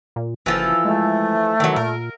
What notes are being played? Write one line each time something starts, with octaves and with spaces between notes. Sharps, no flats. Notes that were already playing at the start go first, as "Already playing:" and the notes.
A#2
F#1 E3 F3 A4
G#3 A3
D#3 E3 F#3
A#2 A#4